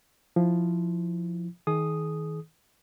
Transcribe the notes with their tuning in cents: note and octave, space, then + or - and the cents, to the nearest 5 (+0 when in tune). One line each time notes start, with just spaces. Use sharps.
F3 +0 E4 +0
D#3 +35 G#4 +30 D#6 -5